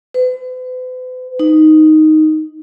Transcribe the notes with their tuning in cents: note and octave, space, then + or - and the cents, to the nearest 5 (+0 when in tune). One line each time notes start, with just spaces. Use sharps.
B4 +45
D#4 +0